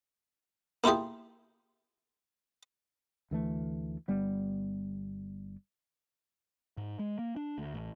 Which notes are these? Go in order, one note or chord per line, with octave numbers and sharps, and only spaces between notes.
A#3 E4 F4 G4 G#4
D2 E3 A3
G1 G3 B3
G#2
G#3
A#3
D4
D2
A1